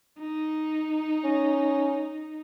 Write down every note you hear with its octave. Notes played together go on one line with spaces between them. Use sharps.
D#4
C#4